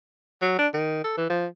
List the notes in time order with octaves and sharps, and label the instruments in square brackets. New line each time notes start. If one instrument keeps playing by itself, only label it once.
[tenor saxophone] F#3
D4
D#3
A4
E3
F3